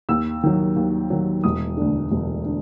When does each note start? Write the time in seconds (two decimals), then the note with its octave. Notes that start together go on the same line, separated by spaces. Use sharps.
0.09 D#2 E6
0.43 D#3 F#3
0.76 D#2
1.10 D#3 F#3
1.44 E1 D#6
1.77 D2 D3
2.11 E1
2.46 D3